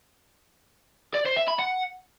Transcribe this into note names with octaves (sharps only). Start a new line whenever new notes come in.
D5
C5
E5
B5
F#5